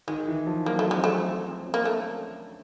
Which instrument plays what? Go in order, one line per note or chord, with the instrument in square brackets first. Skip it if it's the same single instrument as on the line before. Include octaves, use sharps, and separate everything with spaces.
[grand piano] D#3 [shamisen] G#3
[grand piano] E3
F3
[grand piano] F#3 [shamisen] A#3
[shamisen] A3
[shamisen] G#3 [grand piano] C4
[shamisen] A3
[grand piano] C4
C#4
[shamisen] A#3
[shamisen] A3 [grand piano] D4